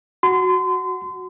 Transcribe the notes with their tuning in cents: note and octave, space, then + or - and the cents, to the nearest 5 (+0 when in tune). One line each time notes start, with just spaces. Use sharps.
F#4 +0 C6 -35